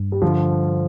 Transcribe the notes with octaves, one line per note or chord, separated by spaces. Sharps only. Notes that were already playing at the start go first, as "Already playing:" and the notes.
Already playing: G2
G3
D3 F3